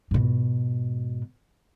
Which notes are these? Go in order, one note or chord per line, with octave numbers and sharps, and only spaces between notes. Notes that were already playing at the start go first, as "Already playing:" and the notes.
G#2 B2